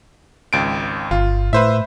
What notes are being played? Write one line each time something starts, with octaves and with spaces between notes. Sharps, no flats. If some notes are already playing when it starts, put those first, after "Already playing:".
G#1 C#2 D7
G1 F4
A2 B4 C5 E5